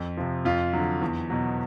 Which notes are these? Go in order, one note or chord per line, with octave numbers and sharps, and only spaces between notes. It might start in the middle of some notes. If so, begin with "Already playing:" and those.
Already playing: F2
C3 F3
F2 F4
D3 F#3
E2
B2 F#3